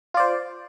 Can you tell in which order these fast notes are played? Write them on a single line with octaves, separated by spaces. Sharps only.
F4 D5 C5